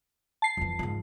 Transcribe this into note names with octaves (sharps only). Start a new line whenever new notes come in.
A5 C7
F2 E3
G#2 F3